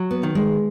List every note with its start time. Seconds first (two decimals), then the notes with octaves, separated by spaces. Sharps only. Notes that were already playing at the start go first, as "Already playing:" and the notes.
Already playing: F#3
0.11 B3
0.23 D#3
0.35 G#3